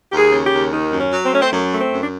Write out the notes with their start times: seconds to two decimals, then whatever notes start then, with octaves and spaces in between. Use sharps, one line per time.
0.12 D#2 G4
0.18 G#4
0.32 C#3
0.46 G4
0.52 D#2
0.72 D#3
0.92 F#2
0.99 C#4
1.12 F#3
1.25 C4
1.33 A3 C#4
1.42 C4
1.53 F#2
1.73 A3
1.80 C4
1.93 F#2
2.02 D4